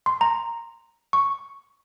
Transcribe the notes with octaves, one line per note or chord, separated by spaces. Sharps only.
C6
A#5
C#6